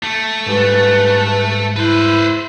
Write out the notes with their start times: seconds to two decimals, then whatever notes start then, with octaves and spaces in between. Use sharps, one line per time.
0.03 A3
0.46 G#2 G3 B4
1.76 E4 B4 C5